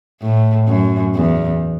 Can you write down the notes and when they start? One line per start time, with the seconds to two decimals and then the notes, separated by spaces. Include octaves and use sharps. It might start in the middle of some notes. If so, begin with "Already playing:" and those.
0.22 A2
0.68 F#2
1.15 E2